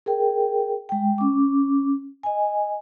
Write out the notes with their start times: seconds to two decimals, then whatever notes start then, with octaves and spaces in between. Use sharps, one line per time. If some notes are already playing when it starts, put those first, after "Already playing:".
0.06 G#4 A#4 G5
0.89 G#3 G5
1.18 C#4 D6
2.23 D#5 G#5